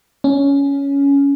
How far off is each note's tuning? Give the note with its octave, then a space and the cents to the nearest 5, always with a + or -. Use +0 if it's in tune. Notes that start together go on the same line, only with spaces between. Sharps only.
C#4 +15